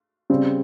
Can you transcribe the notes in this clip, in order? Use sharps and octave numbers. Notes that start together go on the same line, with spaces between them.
C#3 G3 C4